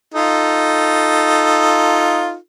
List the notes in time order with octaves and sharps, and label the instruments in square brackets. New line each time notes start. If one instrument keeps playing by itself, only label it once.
[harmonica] D#4 F4 A4